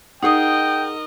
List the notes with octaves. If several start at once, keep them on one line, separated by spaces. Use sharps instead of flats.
D#4 G#4 A#4 D#5 F#5 G5 D#6